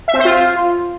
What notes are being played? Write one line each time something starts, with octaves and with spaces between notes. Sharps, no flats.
E5
C4
C5
F4